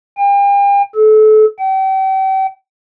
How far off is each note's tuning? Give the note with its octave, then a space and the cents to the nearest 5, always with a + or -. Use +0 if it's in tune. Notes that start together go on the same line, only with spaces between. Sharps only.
G5 +40
A4 -30
G5 -40